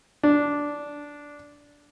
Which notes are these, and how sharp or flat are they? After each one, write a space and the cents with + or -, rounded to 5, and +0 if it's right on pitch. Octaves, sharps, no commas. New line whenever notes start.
D4 -10